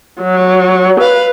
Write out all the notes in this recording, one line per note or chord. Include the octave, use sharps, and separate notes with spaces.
F#3
B4 F5